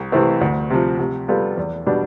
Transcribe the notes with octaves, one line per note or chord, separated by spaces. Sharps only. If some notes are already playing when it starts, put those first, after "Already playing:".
Already playing: C2
C3 E3 A3 C4
D2
C3 F3
C3
G3 B3 F4 A4
E2
B2 G3 D4